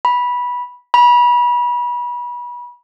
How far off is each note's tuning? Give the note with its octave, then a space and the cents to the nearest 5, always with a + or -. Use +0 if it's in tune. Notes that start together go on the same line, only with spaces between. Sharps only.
B5 -10
B5 -30